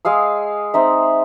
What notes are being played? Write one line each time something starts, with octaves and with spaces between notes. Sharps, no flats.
G#3 G#4 F5 E6
C4 D#4 E5